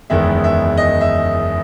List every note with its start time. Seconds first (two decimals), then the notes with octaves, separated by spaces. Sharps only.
0.10 F#1 E2 D#3 G#3 B3 E5
0.44 E5
0.77 D#5
1.01 E5